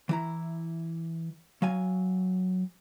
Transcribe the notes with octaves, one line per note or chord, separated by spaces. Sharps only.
E3 E4 A#5
F#3 F5 G#5